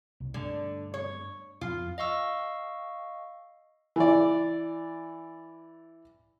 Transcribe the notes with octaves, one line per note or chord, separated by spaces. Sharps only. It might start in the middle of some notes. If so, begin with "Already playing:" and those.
C2
G2 D3 A3
C#5
F2 F4
D#5 F5 C#6 E6
E3 D5